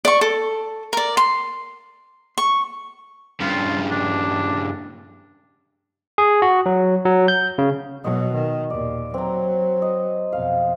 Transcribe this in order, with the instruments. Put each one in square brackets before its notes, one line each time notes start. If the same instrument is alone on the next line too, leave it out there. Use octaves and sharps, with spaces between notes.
[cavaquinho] D5 C#6
A4
A#4 D5
C6
C#6
[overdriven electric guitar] G2 C#3 [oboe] F4
[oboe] D4
[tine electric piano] G#4
F#4
F#3
F#3
G6
C#3
[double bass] B2 F#3 [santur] D#5
[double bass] D#3
[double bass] D#2 A#2 [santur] D5
[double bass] F#3 [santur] C4 A#5
[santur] D#5
[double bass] F2 B2 [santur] F5